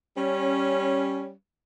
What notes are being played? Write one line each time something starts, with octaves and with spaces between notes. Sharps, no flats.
G3 C#4